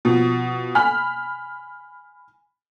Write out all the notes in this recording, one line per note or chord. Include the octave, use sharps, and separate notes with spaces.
B2 F3
G#5 B5 F6